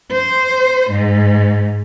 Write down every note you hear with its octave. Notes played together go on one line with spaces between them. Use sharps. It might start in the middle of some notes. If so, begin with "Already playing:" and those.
C5
G#2